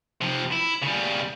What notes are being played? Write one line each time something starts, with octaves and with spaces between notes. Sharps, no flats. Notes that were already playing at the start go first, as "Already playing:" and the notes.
C3 F3
E4
C#3 G3